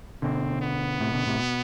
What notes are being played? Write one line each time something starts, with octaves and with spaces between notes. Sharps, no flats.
B2 D3 C4
B3
A2 C3
B2 D3
A2 C3
B2